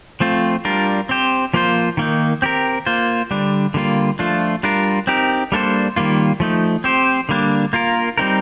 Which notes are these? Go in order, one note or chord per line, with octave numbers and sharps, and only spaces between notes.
F3 A3 C4 F4
G3 D4 F4 A#4
C4 G4 C5
F3 A#3 F4 C5
D#3 A#3 D#4
C4 G4 A#4
A#3 F4 C5
D3 G3 D4
D3 G3 A#3 F4
F3 A3 D4 F4
G3 D4 F4 A#4
C4 D#4 G4 A#4
G3 A#3 D4 A4 C5
D#3 G3 A#3 F4
F3 A3 D#4
C4 G4 C5
D3 G3 A#3 D4
A#3 F4 A#4
G3 C4 D#4 A#4